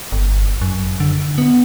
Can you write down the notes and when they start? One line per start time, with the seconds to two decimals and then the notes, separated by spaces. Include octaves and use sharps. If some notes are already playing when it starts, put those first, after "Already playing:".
0.12 G1
0.61 F#2
1.00 D3
1.38 B3